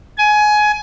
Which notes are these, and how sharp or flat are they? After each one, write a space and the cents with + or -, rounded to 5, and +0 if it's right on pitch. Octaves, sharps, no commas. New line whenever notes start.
G#5 +20